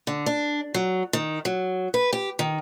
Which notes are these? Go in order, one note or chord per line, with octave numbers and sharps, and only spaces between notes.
D3
D4
F#3
D#3
F#3
B4
G4
D#3